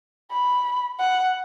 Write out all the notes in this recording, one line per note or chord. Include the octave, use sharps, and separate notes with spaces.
B5
F#5